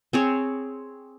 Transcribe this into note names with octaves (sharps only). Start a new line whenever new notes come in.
C4 G#4 C#5